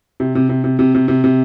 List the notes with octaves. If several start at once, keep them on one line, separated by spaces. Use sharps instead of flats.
C3
C3
C3
C3
C3
C3
C3
C3